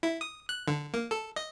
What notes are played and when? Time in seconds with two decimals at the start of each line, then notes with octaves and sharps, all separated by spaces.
0.03 E4
0.21 D#6
0.49 F#6
0.68 D3
0.94 A#3
1.11 A4
1.36 D#5